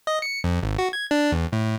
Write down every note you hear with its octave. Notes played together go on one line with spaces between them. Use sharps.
D#5
C#7
F2
G#1
F#4
G#6
D4
E2
A2